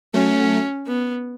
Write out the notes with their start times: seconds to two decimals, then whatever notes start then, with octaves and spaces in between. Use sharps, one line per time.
0.14 F#3 A3 C#4
0.87 B3